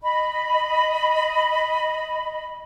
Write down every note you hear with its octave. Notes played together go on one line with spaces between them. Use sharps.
D#5 B5